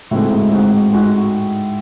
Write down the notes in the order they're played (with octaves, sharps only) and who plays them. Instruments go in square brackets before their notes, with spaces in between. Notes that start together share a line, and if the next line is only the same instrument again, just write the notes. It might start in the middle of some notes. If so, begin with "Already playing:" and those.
[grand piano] A2 [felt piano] G#3 C4 D#4 F#4
[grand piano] G#2
[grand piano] G#2 [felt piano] G#3 C4 D#4 F#4
[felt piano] G#3 D#4 F#4